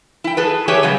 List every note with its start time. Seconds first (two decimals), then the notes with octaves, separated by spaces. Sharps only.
0.24 E4 G5
0.37 G#4 A4 B4
0.68 G4 G#4 B4 C#5 E5 G5
0.83 C#3 F#3 G3